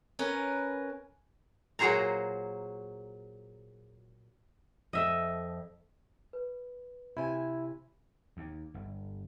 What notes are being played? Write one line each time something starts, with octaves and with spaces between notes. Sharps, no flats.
C#4 A#4 B4
A#2 F#3 F#4 G#4 C5 A#5
F2 A3 D#5 E5
B4
C3 E4 G#5
D#2
G1